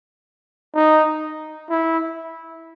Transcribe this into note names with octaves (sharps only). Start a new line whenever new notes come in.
D#4
E4